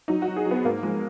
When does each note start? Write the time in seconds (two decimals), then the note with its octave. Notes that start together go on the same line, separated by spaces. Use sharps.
0.08 F#3 D#4
0.22 F#4
0.28 F#3
0.37 G#4
0.46 F#3
0.51 B3
0.65 G#2 A#3
0.83 F3 G#3